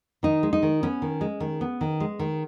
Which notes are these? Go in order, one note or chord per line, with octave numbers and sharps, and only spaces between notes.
D#3 D#4
G#3
D#4
D#3
B3 C#4
D#3
G#3
D#3
B3
D#3
G#3
D#3